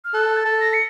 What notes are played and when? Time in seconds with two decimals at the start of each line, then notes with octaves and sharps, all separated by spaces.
0.05 F6
0.14 A4 F#6
0.37 A6
0.45 A4
0.60 A#6
0.73 C#7